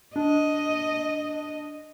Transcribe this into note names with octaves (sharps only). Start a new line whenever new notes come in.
D4 D#5